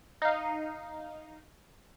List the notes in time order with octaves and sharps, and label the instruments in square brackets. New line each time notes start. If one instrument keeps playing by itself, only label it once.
[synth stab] D#4 F5